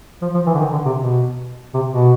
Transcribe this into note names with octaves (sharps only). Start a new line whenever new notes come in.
F3
F3
E3
D3
D#3
D3
C3
B2
C3
B2